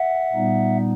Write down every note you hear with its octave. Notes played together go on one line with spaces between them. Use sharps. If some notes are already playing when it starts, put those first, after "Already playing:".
Already playing: E5 F#5
A#2 G3 B3 D#4